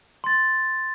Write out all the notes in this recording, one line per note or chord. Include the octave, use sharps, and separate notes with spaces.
C6 A6